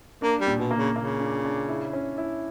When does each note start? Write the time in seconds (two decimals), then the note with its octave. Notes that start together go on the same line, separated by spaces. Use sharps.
0.22 A#3 D4
0.41 G3
0.47 A#2
0.59 B2
0.71 A#3
0.77 C#3
0.96 C#3 A#3
1.20 D4
1.45 D4
1.69 E4
1.93 C#4
2.18 E4